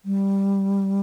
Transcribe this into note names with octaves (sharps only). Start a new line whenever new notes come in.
G3